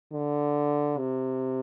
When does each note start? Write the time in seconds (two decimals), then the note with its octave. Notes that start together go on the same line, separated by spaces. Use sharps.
0.12 D3
0.98 C3